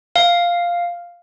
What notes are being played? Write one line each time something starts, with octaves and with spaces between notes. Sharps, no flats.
F5